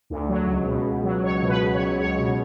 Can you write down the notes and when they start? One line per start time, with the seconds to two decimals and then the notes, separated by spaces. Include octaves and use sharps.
0.10 D2
0.29 F#3
0.47 C#2
0.66 B2
0.85 C#2
1.04 F#3
1.23 C#2 C#5
1.43 B2
1.49 B4
1.62 C#2
1.74 C#5
1.80 F#3
1.99 C#2 C#5
2.18 B2